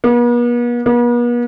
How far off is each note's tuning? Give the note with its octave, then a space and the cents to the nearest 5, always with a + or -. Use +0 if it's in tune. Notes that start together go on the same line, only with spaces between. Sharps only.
B3 -45
B3 -45